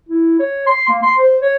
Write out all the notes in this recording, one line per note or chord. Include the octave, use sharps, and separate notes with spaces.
E4
C#5
C6
A#3
C6
C5
C#5